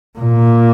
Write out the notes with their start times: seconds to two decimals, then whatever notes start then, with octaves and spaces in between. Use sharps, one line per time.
0.19 A#2